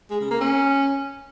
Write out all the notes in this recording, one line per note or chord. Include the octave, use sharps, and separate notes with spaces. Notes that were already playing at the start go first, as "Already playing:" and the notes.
G#3
C#3
A#3
C#4